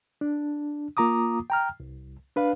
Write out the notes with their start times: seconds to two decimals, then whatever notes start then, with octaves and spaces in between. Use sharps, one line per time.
0.21 D4
0.97 A#3 F4 A#5 D6 D#6
1.50 G5 A#5 F6
1.80 C2
2.36 D4 B4 F5